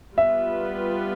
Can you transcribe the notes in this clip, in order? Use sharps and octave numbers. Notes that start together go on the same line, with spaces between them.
G3 B3 F4 B4 E5